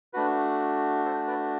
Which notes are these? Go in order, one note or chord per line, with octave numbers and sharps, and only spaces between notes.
A3 D4 F#4 B4
A4 C5
B4 D5